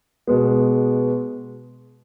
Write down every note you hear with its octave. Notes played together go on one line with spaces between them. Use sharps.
B2 G#3 B3